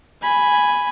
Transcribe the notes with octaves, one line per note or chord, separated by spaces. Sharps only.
G#5 B5